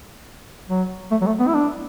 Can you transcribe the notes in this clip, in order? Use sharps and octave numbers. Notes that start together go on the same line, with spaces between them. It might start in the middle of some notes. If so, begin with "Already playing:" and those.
F#3
A3
F#3
A3
B3
E4
D4